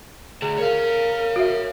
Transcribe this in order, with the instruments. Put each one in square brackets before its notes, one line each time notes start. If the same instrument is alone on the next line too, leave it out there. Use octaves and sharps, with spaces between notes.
[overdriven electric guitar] D2 [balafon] G#4 [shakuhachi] A#5
[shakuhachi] A#4 [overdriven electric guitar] C#5 F5
[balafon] F#4 E5